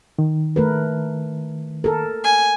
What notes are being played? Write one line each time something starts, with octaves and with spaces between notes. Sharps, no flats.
D#3
A3 A#4 B4
A4 A#4
G#5